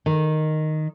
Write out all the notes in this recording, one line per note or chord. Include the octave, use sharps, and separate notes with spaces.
D#3